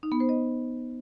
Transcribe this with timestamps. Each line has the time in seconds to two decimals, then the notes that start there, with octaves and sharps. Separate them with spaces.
0.03 D#4
0.12 B3
0.20 C5
0.29 D#5